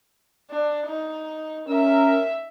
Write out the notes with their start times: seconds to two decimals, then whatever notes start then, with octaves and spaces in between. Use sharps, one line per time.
0.50 D4
0.86 D#4
1.68 C#4 A#4 E5